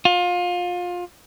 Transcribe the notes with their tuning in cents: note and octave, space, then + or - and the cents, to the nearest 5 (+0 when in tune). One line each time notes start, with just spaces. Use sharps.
F4 +25